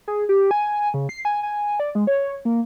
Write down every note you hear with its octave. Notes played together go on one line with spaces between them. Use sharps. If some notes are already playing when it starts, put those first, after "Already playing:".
G#4
G4
G#5
C#3
C7
G#5
G#5
D5
G#3
C#5
A#3